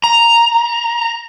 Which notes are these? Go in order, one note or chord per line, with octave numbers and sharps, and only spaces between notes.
A#5